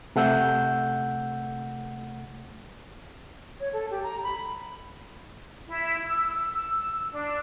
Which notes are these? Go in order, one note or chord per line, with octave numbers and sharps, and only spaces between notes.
C3 A3 F#5 E6 G6
C#5
A4
G4
A#5
B5
E4
E6
E6
D4